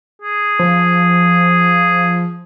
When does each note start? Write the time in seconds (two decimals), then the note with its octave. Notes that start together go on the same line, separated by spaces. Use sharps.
0.22 G#4
0.59 F3